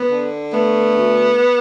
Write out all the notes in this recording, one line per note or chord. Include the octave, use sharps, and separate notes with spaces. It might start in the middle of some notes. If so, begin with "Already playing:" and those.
Already playing: B3
D3
A3 B3
D2